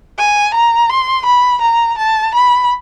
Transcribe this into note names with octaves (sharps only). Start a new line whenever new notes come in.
G#5
A#5
C6
B5
A#5
A5
B5